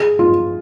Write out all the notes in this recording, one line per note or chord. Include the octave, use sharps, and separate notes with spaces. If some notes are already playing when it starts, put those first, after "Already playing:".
Already playing: G#4
F4